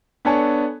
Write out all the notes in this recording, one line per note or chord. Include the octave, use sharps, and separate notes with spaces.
B3 D4 A4 C#5 G#5 A5